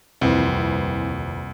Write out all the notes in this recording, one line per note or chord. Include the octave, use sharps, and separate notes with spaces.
D#1 C2 F2 E3 C4 B4